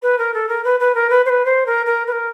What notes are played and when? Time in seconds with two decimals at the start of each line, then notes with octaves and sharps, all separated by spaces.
0.02 B4
0.18 A#4
0.33 A4
0.48 A#4
0.64 B4
0.80 B4
0.94 A#4
1.09 B4
1.25 C5
1.29 B4
1.45 C5
1.66 A#4
1.86 A#4
2.07 B4
2.12 A#4